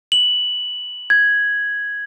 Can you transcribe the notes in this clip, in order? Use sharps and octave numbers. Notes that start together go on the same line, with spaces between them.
F#7
G#6